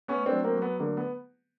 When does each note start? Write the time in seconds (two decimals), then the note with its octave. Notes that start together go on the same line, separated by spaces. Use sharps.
0.08 A3 B3 C#4
0.26 C4 D4
0.32 F#3
0.44 A#3 C4
0.55 F#3
0.62 B3
0.79 D3 A#3
0.97 B3